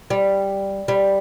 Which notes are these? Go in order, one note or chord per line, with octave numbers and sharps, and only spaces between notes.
G3
G3